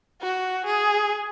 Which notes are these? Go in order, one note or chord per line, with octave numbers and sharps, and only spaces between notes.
F#4
G#4